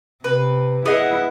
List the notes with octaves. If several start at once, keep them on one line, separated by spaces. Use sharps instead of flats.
C3 B4
B3 E4 G#4 D#5 F#5